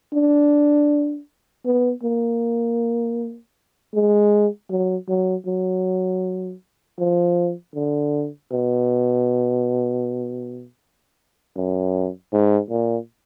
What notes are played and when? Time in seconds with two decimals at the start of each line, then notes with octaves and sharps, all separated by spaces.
0.13 D4
1.65 B3
2.03 A#3
3.94 G#3
4.70 F#3
5.09 F#3
5.46 F#3
6.99 F3
7.74 D3
8.51 B2
11.56 F#2
12.33 G#2
12.70 A#2